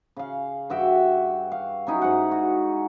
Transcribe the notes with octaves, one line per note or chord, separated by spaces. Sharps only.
C#3 F5
G2 F#4 E5 G5
F5
F#3 C#4 D#4 E4
G#2 F#5
F#4